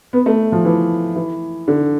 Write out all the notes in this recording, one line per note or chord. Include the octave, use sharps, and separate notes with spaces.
B3
A3
F3
E3
E3
D3